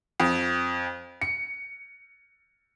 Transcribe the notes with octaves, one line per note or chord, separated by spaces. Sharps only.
F2
C#7